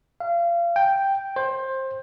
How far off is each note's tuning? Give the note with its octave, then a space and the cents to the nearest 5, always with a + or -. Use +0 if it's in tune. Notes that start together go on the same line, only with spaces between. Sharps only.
F5 -30
G5 +0
C5 +20